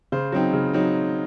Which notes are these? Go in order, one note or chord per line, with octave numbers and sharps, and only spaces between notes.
C#3 C5
F#3 C4 D#4
C#3
F#3 C4 D#4